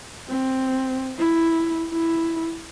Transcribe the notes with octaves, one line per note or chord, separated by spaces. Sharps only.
C4
E4
E4